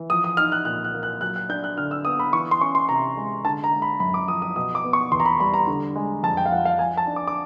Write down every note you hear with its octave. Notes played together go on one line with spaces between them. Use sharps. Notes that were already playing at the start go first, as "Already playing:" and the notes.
Already playing: E3
F3 D#6
D#6
D#4 F6
F#6
A#2 F#6
F#6
A#3
F#6
F#3 F#6
F#6
D4 G6
F#6
D3 F6
E6
B3 D#6
B5
E3 C#6
C6
C#4 C#6
C6
C3 A#5
G#3
D3 A5
A#5
G#3
B5
F#2 B5
D6
F3 D#6
D#6
B2 D#6
D6
B3
C#6
E2 C6
A#5
B5
G3 B5
A#5
D3
G#3
F2 A5
G5
F5
F3 F#5
F5
F3 G#5
A5
D4
D6
D6